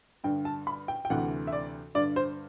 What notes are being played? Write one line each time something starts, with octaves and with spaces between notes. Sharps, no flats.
G2 D3 G5
A5
B5
G5
G5
D2 C3 E3 F#5
E5
D5
G2 D3 D5
C5